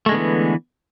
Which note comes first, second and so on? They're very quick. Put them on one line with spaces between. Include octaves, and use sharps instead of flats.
A3 G#3 D3 B3 E3